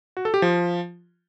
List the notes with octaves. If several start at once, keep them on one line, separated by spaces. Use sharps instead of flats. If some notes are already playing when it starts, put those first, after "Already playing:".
F#4
A4
G4
F3